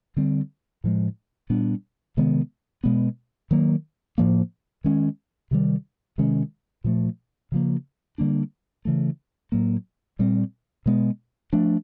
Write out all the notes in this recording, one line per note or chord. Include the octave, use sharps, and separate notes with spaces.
D3 G3 C4
A2 F3 G#3
A#2 G3 B3 D4
C3 D#3 G#3 B3
B2 G#3 B3
D#3 F#3 A#3
A2 F3 A#3
D#3 G#3 C#4
C3 D#3 G3
C3 D#3 G#3 C#4
A#2 F3 A3
C#3 F3 A#3
D3 G3 A#3 D4
C#3 E3 A3
A2 F#3 A#3
A#2 G3 C4
B2 G#3 B3
F3 A3 D4